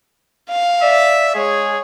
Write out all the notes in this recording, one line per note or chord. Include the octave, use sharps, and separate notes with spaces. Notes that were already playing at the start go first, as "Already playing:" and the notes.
F5
D5 E5
G#3 G#4 C#5